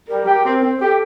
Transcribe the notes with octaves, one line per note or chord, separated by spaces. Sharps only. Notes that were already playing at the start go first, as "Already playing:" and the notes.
G3 A#4
G4
C4
C4
G4 A4